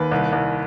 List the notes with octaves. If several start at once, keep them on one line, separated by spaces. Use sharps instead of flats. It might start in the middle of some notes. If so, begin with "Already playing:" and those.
Already playing: D#2 B4
C2
C2